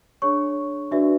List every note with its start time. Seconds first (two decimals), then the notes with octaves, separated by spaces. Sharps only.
0.22 D4 G#4 C#5 C#6
0.91 D4 F#4 B4 D5 E5